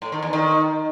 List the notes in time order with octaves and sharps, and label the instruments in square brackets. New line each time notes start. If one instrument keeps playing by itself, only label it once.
[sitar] A2
D#3
E2
D#3